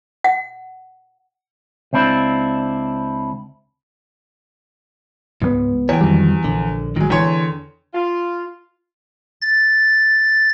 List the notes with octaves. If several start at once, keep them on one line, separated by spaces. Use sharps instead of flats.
F#5
C#2 C4 D4 E4
C#2 G#2 F3 B3
E2 C#5 G5
F2 D#3 F#3 G3
A#1 D3
G#2 D#3 F#3 G#3
E2 D3 C#5 G5 C6
F4
A6